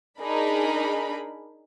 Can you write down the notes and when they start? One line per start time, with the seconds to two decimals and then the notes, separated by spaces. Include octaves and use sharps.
0.20 D4 D#4 G#4 A#4 B5